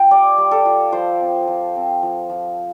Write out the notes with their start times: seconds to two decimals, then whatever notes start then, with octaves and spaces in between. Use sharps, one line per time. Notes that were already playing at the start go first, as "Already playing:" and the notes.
Already playing: F4 F5 G5
0.11 G3 D5
0.38 G3
0.51 A4
0.65 F4
0.92 F3 C5
1.20 C4
1.48 F3
1.75 C4
2.03 F3
2.30 F3